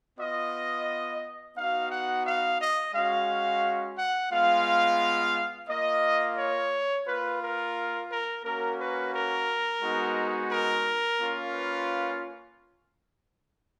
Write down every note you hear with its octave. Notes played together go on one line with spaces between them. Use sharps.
B3 F4 D#5
B3 D#4 F#4 F5
F#5
F5
D#5
G#3 C#4 F#4 F5
F#5
G#3 B3 F4 F5
A#3 F4 D#5
C#5
A#3 F4 B4
A#4
A#4
A#3 C#4 F#4 A#4
B4
A#4
G#3 B3 D#4 F#4
A#4
A#3 C#4 F4
B4